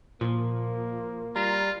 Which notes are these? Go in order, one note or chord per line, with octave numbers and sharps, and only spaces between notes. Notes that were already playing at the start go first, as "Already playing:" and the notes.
A#2 F3 A#3
G3 F4 A#5